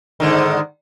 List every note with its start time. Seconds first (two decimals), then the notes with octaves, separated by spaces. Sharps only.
0.20 G#2 D3 D#3